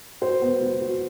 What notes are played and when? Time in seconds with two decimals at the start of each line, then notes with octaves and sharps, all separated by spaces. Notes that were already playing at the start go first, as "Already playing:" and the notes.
0.21 F#3 C5
0.42 B3
0.62 F#3
0.81 F#3